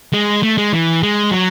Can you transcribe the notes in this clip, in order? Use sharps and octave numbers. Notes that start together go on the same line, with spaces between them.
G#3
A3
G#3
E3
G#3
F#3